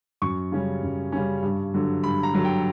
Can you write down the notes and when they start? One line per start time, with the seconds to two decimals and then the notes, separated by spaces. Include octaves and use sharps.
0.22 F#2 C#6
0.52 C#3 G3 C#4
0.83 F#2
1.12 C#3 G3 C#4
1.43 G2
1.74 D3 F#3
2.04 G2 B5
2.23 A#5
2.34 D3 F#3
2.44 G5